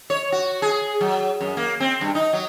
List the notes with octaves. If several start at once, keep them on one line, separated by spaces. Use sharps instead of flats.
C#5
F#4
G#4
F#3
F#2
A#3
C4
G2
D#4
F#3